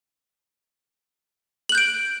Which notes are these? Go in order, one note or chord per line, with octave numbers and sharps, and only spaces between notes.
F#6 G6 D7 F#7